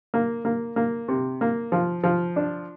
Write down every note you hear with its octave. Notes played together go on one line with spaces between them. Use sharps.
A#3
A#3
A#3
C3
A#3
F3
F3
D4